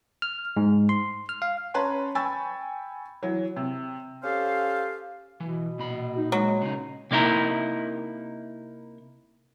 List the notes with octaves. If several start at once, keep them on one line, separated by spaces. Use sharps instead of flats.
F6
G#2
C6
F6
F5
C#4 B4 C#5 A5 A#5 C6
G5 G#5 B5 C#6 E6 A6
E3 F#3
C3
C#4 G4 A4 C5 F5
B2 E3
A#2 B5
D#4
F#3 G#3
C#3 D#4
C3 A#3 D#4 E4 A#4